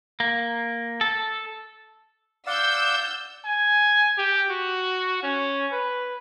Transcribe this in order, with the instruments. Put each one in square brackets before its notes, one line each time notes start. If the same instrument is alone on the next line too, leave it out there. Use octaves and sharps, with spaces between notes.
[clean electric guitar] A#3
A4
[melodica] D5 F5 F#5 [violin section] E6 G6
[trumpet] G#5
G4
F#4
C#4
B4